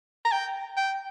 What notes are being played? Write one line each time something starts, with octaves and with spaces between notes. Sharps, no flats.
A#5
G5
G5